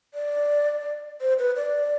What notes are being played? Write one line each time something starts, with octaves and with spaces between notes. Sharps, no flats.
D5
C5
B4
D5